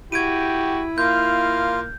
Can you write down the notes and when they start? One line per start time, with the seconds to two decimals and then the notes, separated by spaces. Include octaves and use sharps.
0.12 E4 F#4 G4 G5 G#6 D7 D#7
0.98 A#3 F4 F6 G6